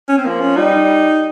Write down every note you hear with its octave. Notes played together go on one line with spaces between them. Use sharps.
C#4
C4
F3 A#3
C#4
G3 D#4